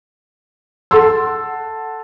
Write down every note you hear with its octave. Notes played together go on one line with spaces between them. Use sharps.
A4 F#5 A5 C6 E6